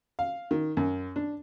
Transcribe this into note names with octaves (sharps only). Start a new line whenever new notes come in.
F5
D#3
F#2
D4